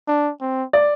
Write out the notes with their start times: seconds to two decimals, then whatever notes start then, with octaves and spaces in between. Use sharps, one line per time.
0.08 D4
0.41 C4
0.73 D5